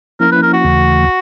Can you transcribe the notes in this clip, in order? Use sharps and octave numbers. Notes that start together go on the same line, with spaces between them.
F3 A#3 C#4 E4 A#4
B4
A#4
F#4
D#2 C#3 E3 A3